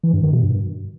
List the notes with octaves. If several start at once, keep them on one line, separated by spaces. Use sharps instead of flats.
E3
G2
D#3
B2
G2